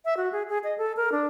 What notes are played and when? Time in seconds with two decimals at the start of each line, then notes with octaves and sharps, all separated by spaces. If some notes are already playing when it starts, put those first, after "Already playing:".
0.05 E5
0.17 F#4
0.32 G#4
0.49 G#4
0.64 D#5
0.78 A4
0.97 A#4
1.12 D4